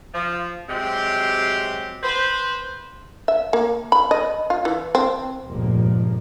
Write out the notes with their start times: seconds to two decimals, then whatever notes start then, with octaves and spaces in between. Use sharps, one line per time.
0.14 F3
0.69 C3 F#3 G#3 C4 G4
2.03 B4 C5
3.28 E5
3.53 A#3
3.92 B5
4.11 D#5
4.50 F4
4.65 E3
4.95 C4
5.46 F1 C#2 G2 A#2 F3 A#3